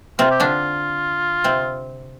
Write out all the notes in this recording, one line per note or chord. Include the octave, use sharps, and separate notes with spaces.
C3 C4 F4
G4
D3 D4 F4
C3 C4